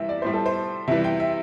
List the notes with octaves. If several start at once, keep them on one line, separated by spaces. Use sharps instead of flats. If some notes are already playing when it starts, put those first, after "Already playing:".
Already playing: C3 E3 G3 E5
D5
A2 G3 C5
A4
C5
C3 E3 G3 E5
G5
E5